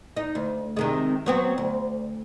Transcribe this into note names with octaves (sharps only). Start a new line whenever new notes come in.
D#4
D2
C3 D#3 G#3
F#3 B3 C4
D2